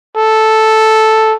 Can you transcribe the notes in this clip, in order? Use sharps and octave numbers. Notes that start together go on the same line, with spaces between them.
A4